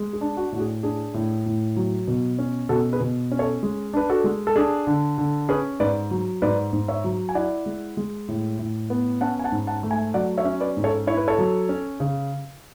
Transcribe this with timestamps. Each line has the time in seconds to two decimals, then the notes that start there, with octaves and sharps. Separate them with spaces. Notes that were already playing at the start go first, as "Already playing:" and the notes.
Already playing: G#3
0.13 G#4
0.21 D4
0.37 F#4
0.52 A2 F#4
0.60 G#4
0.83 D4 G#4
1.14 A2
1.46 A2
1.77 F#3
2.08 B2
2.39 C#4
2.69 B2 F#4 A4
2.93 G#4 B4
3.00 B2
3.31 C#4
3.39 A4 C#5
3.63 G#3
3.93 D4 B4
4.09 F#4 A4
4.24 G#3
4.47 A4
4.56 D4 G#4
4.87 D3
5.18 D3
5.49 C#4 G#4 B4
5.80 G#2 B4 D5
6.11 F#3
6.42 G#2 B4 D5
6.73 G#2
6.88 C#5 E5
7.04 F#3
7.29 G#5
7.35 E4 D5 F#5
7.66 G#3
7.97 G#3
8.28 A2
8.59 A2
8.90 B3
9.21 C#4 F#5 A5
9.39 G#5
9.44 F#5 A5
9.52 G#2
9.67 F#5 A5
9.83 A3
9.91 E5 G#5
10.14 F#3 D5 F#5
10.38 C#5 E5
10.45 C#4
10.60 B4 D5
10.77 G#2
10.84 A4 C#5
11.07 E4 C#5
11.17 B4
11.28 A4 C#5
11.38 F#3
11.69 C#4
12.00 C#3